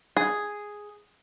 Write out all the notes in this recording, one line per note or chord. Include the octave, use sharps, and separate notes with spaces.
G#4